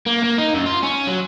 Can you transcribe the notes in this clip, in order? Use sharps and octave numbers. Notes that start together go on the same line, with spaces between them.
A#3
A#3
D#4
F#2
F4
C#4
F#3